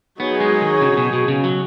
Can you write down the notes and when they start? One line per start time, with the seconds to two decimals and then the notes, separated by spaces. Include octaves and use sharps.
0.20 F#3 B3 D#4 G#4 C#5
0.40 G#3
0.61 D#3
0.81 C#3
0.92 C#3
0.97 B2
1.13 B2
1.28 C#3
1.44 F#3